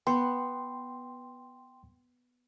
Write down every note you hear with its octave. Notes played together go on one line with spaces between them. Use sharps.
B3 G5 C6